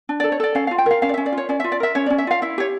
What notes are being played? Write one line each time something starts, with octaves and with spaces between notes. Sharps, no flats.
D4
A4 D5
C#5
A4 D5
C#4 F5
F4 F5
G5
A#4 F5
C#4 F5
D5
C#4 E5
D5
F4
C#5
C#4 D5
F4 E5
D5
A#4 E5
C#4 C#5
C#4 D5
E5
F4 F5
E4 E5
G4 C#5